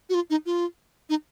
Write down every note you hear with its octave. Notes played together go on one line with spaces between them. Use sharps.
F#4
F4
D#4
F4
D#4